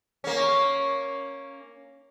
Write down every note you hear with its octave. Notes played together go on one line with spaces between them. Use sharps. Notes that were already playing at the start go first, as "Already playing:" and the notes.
A#3 C#4